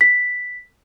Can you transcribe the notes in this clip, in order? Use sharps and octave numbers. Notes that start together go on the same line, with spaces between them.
B6